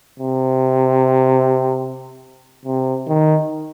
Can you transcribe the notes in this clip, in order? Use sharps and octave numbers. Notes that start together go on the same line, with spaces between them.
C3
C3
D#3